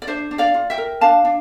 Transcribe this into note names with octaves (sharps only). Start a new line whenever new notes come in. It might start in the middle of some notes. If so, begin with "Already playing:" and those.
D5
D4 C5 E5
D4
D5 F5
F4
E5 G5
A#4
D4 F5 A5
D4